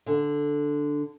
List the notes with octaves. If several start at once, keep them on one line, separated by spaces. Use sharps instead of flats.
D3